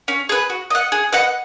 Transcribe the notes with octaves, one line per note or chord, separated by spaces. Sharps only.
C#4
G#4 B4
F#4
D#5 F#5
G#4
B4 D#5 F#5